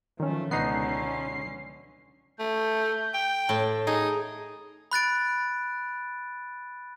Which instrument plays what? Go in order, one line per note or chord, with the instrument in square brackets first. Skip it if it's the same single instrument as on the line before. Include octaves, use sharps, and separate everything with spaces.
[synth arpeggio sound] D#3 C#4 [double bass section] F3 [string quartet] F#3 A3
[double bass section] C#2 B2 [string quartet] D3 C#4 [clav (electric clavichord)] B3 D#4 [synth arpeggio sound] C7
[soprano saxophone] A3 [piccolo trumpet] G6
[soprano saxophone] G5
[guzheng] A2 [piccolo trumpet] A5
[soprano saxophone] D#4 [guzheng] G#4
[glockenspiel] B5 F#6 A6 D7